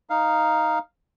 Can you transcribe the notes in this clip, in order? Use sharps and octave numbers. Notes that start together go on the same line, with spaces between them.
D#4 F5